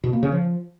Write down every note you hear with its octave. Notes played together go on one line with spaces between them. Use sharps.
B2
A#3
C#3
F3